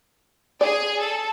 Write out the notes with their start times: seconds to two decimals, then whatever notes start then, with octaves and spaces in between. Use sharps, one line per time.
0.61 G#4 D5
1.00 A4